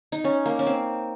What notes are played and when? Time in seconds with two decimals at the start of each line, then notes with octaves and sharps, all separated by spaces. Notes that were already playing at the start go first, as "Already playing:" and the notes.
0.12 D#4
0.24 C#4
0.46 A#3
0.59 C#4
0.66 C4